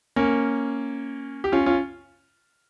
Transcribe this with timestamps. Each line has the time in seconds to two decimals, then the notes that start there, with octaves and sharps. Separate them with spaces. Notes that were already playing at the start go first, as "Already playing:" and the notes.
0.16 A#3 C#4
1.44 G4
1.52 C#4 F4
1.66 C#4 F4